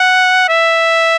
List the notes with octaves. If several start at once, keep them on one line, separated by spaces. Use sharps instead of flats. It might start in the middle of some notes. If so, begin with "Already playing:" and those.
Already playing: F#5
E5